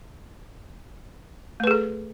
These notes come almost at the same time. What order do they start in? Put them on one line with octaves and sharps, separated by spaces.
A3 B4 G#4 A4